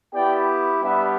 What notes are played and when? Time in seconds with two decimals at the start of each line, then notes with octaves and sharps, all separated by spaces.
0.14 B3 E4 G4 D5 G5
0.82 G3 B3 D4 G4 B4 E5